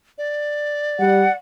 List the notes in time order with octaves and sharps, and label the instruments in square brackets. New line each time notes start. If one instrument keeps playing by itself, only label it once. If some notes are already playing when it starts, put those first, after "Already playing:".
[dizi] D5
[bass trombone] G3 [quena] F#5